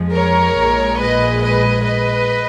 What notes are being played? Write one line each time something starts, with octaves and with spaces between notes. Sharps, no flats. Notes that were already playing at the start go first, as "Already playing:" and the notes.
Already playing: F2 F3 G#3
A#4 C#5
A#1 A#2 G#3
B4 D#5
B4 D#5
B4 D#5